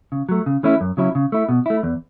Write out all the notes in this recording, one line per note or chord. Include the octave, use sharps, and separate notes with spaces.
C#3
F#3 A3
C#3
E3 A3 C#4 E4
F#2
C#3 F#3 C#4 E4
C#3
A3 E4
B2
A3 E4
E2